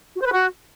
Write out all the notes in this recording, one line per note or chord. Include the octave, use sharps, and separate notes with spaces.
F#4
C5
B4
F#4